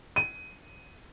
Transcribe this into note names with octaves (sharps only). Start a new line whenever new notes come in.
D#7